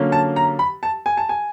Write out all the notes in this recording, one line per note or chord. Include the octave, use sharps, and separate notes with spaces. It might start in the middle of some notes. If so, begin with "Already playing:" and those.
Already playing: D3 F#3 A#3 C#4
A5
A#5
B5
A5
G#5
A5
G#5